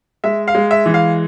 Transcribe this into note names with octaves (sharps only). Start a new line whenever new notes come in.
G#3 E5
F5
G#3
E5
E3
F5